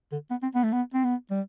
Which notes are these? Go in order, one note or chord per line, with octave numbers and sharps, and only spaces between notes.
D3
B3
C4
B3
A3
B3
C4
B3
G3